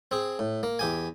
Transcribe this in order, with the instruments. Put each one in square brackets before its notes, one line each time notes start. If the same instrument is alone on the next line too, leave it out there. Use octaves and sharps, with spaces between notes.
[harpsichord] C4 G#4
A2
A#3
E2 G4 G#5